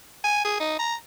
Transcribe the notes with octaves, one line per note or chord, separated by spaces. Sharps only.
G#5
G#4
D#4
A#5